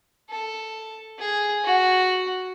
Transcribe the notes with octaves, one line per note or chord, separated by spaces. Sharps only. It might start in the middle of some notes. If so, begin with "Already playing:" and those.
A4
G#4
F#4